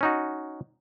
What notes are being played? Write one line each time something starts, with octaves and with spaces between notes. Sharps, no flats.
C#4 D#4 F#4